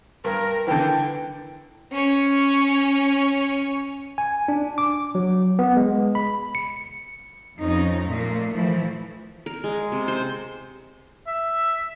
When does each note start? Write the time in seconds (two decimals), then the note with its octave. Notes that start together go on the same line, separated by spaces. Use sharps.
0.24 G2 A#4
0.67 D3 E3 G5
1.92 C#4 C#5
4.18 G#5
4.48 D4
4.78 D6
5.15 F#3
5.59 B3
5.77 G#3
6.15 B5
6.55 C#7
7.58 F2 F3 C#4 D#4
8.06 A#2 A3 A#3
8.53 E3 F3 A3
9.46 A#4
9.64 G#3
9.92 C3
10.08 C5
11.27 E5